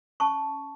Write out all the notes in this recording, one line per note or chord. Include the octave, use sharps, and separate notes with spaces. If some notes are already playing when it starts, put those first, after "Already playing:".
C#4 A5 C#6